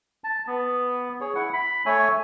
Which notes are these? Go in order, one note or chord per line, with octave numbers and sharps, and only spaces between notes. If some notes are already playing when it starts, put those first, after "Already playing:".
A5
B3
G#4 C#5
E4 F#5
B5
A3 C#5 G#5